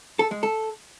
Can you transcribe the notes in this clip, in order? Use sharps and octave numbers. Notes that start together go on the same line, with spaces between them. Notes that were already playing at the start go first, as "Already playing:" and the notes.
A4
G#3
A4